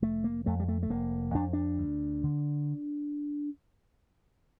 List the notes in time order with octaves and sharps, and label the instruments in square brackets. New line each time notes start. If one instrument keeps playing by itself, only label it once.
[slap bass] F1 A3
A#3
F2 A3
G3
A3
A3
F1 A#3
F2 D4
D4
D2
D3